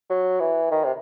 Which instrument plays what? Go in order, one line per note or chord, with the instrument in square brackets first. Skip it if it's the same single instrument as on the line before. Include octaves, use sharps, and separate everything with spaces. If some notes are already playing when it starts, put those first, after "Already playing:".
[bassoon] F#3
E3
D#3
C3